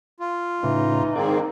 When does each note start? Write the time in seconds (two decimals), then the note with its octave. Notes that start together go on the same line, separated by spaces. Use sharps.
0.20 F4
0.63 A2 C#3 E3 D#4
1.15 G#2 D#3 A#3 C4 G#4 D5